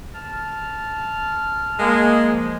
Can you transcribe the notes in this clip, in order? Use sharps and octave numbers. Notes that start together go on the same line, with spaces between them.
A5 F6
G#3 A#3 G#4
F3